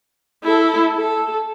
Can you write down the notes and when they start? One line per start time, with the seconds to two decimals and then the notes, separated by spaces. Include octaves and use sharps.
0.44 E4 A4
0.95 A4